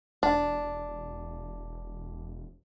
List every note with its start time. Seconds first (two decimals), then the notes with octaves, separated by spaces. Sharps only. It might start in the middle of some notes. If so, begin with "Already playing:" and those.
0.23 E1 D4